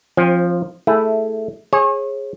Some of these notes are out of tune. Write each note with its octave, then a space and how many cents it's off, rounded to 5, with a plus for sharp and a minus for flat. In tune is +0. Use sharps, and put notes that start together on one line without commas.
F3 +0 C4 +30 G#5 +0
A3 +0 E4 -5 G#4 +0
G#4 +0 C#5 -35